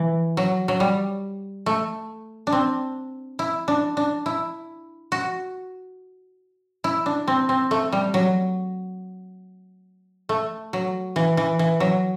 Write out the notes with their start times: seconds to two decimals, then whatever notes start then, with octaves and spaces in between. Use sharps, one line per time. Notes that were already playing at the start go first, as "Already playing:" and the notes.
Already playing: E3
0.37 F#3
0.68 F#3
0.80 G3
1.66 A3
2.47 D4
2.52 C4
3.39 E4
3.68 D4
3.97 D4
4.26 E4
5.12 F#4
6.84 E4
7.06 D4
7.28 C4
7.49 C4
7.71 A3
7.92 G3
8.14 F#3
10.29 A3
10.73 F#3
11.16 E3
11.37 E3
11.59 E3
11.80 F#3